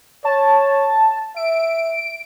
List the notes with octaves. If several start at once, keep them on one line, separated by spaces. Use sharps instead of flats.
C#5 A5
E5 D7